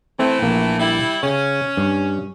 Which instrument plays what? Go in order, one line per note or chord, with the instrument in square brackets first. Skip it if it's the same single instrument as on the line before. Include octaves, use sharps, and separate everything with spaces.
[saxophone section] E3 A3 [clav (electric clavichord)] C4
[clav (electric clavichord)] A#1 A#3
[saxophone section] G3 E4
[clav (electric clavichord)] C#3 [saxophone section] C#4
[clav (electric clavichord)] G2